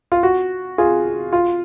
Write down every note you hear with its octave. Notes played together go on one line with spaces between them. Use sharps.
F4
F#4
F4 G#4
F4